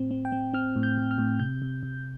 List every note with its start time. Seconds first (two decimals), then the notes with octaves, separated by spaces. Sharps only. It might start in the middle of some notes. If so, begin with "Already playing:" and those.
Already playing: A2 C4
0.11 C4
0.25 G5
0.32 C4
0.53 C4 F6
0.76 A2
0.83 G6
0.98 A2
1.11 F6
1.18 A2
1.39 C3 G6
1.62 C3
1.83 C3